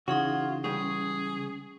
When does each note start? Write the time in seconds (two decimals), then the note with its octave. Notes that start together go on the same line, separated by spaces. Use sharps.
0.08 C#3 E3 D#4 F4 F#4 G#4 F#5
0.64 C#2 G3 C#4 G#4